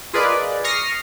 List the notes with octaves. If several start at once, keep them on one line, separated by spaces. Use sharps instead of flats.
F4 G#4 A#4 B4 D5 D#5
C#6 D#6 F6 A#6 C7